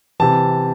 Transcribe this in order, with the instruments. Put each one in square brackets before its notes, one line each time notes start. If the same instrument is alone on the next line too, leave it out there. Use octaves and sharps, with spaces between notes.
[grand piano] C3 E3 A5